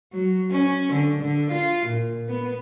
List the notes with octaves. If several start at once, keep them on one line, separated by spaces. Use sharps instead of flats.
F#3
C#4
D3
D3
F4
A#2
B3